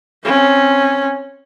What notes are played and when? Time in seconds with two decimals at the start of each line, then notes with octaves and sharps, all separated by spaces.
0.24 C4 C#4